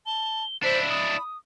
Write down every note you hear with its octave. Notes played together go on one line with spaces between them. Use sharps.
A5 G7
D4 E4 C5 B6
B5 D#6